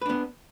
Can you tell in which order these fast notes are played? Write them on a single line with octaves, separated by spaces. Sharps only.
B4 D4 B3